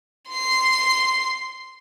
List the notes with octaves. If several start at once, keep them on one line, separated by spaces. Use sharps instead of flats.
C6 C7